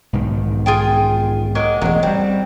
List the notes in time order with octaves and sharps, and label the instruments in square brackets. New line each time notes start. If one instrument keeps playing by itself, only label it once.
[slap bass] B1 G#2 D#3
[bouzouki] F4 G#4 G5
F#3 G#3 A#3
[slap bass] E1 A1 [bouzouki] F#3 G#3
[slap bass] F#3 G3 [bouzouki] C4